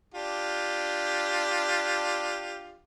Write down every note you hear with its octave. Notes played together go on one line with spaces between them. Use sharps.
D4 F4 G4